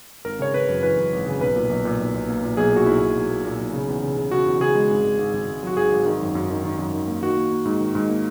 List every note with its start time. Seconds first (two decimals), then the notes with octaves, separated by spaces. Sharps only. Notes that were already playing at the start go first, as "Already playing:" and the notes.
0.25 G#1 A#4
0.39 C#3 C#5
0.54 C#3 B4
0.68 F#2
0.83 E3 B4
0.97 F#2
1.13 G#1
1.26 C#3
1.41 B1 B4
1.56 A#2
1.70 B1
1.85 A#2
2.00 B1
2.14 B1
2.29 A#3
2.43 A#2
2.57 B1 G#4
2.72 A#2 F#4
2.86 B1 E4
3.01 B1
3.15 B1
3.30 A#3
3.45 A#2
3.59 B1
3.73 C#3
3.88 E2
4.03 C#3
4.17 C#3
4.31 C#3 F#4
4.46 E2
4.60 C#3 G#4
4.75 G#3
4.90 G#1
5.04 G#1
5.19 G#1
5.33 G#1
5.48 G#1
5.63 F#3 F#4
5.77 G#1 G#4
5.91 G#1
6.06 D#3
6.21 F#2
6.35 F#2
6.50 D#3
6.64 D#3
6.79 F#2
6.93 D#3
7.08 A#3
7.22 D#3 F#4
7.37 A#3
7.51 A#3
7.65 G#2
7.80 D#3
7.95 G#2
8.10 A#3